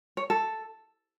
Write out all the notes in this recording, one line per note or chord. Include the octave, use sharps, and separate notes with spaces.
C#5
A4